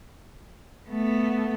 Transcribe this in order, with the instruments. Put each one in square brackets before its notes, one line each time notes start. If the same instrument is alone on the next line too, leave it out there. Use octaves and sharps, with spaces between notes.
[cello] A3 B3